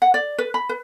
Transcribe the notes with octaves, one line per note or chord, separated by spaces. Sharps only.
F#5
D5
B4
B5
B4